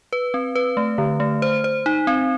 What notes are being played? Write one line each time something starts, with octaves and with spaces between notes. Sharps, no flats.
B4
C4
B4
A3
D3
A3
C5
C5
D#4
C4